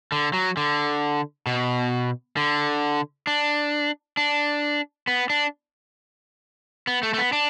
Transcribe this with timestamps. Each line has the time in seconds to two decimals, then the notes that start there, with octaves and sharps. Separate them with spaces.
0.12 D3
0.33 F#3
0.57 D3
1.46 B2
2.37 D3
3.27 D4
4.17 D4
5.07 B3
5.30 D4
6.87 B3
7.03 A3
7.14 A3
7.18 B3
7.33 D4